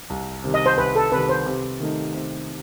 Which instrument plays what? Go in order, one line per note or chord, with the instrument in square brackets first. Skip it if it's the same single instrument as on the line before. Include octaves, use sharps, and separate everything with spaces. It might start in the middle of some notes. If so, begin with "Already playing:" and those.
[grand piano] C2
C3 D#3 G3
[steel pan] D#5
C5
[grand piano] C2 [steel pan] B4
[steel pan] A4
[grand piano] C3 D#3 G3 [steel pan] B4
[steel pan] C5
[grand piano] C3
D#3 A3 D#4
C3